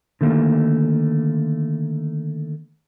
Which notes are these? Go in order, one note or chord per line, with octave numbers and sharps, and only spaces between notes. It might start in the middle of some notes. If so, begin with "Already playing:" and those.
D3 D#3 A3 A#3